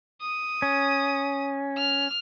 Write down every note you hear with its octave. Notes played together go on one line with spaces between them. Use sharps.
D#6
C#4
F6